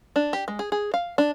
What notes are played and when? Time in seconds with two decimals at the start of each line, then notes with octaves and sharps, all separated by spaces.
0.16 D4
0.33 G4
0.48 G#3
0.59 G#4
0.72 G#4
0.94 F5
1.18 D4